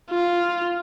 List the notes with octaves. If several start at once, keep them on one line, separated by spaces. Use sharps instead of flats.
F4